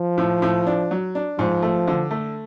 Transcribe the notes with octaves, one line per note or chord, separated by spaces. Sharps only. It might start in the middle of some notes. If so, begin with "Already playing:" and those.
Already playing: F3
A2
A2
D4
F#3
D4
G#2 F3
A3
D3
A3